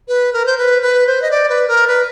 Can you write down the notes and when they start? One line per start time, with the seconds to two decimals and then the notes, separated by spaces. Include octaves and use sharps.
0.08 B4
0.33 A#4
0.46 C5
0.58 B4
0.82 B4
1.07 C5
1.22 D#5
1.31 D5
1.49 B4
1.68 A#4
1.87 B4